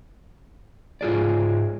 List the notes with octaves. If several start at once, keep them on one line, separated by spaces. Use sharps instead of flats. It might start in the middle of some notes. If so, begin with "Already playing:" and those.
G#2 F4 G#4 D5